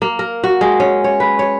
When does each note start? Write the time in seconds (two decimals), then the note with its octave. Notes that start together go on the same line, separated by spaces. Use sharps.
0.02 A#3
0.19 A#4
0.44 F#4
0.61 G#3
0.80 C#4
1.04 C#5
1.20 B4
1.39 C#5